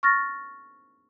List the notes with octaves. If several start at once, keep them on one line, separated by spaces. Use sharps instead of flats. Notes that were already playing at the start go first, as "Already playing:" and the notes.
C#6 F6 A6 A#6